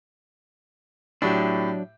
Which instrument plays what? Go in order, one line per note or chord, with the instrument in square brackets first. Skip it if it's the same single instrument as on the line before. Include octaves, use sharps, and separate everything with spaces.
[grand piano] A2 G4 [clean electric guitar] F#3 D4